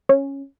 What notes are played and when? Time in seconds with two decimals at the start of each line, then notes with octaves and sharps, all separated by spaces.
0.09 C#4